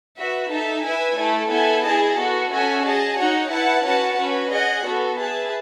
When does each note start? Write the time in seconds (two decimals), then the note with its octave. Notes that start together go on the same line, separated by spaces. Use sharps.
0.17 F#4 B4 E5
0.51 D#4 A4 E5 A5
0.84 E4 B4 E5 G#5
1.17 A3 E4 A4
1.50 B3 E4 A4 E5 G#5
1.84 E4 G#4 D#5 A5
2.17 B3 F#4 A4
2.51 C#4 F#4 A4 E5 G#5
2.85 G#4 D#5 A5
3.17 D#4 F#4 C#5 F#5
3.51 E4 B4 F#5 A5
3.84 C#4 F#4 B4 F#5 A5
4.18 C#4 F#4 B4
4.51 G#4 D#5 F#5
4.85 B3 F#4 A4
5.18 G#4 B4 E5 A5